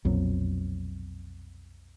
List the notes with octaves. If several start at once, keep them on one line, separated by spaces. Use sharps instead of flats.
B1 F2 A#2 F#3